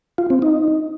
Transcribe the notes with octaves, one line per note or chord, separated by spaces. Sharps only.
F4
C4
D#4